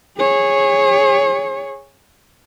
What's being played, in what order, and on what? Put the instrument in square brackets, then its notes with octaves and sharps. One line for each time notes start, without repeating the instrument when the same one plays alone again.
[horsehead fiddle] G#4 C#5